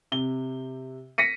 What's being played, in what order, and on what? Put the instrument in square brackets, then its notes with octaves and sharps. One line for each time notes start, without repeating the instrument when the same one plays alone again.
[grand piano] C3 G7
A#6 B6 C#7 D#7